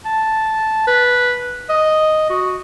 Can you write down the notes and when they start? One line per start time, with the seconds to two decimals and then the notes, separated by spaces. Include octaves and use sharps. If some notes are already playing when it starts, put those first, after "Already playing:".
0.05 A5
0.87 B4
1.69 D#5
2.30 F#4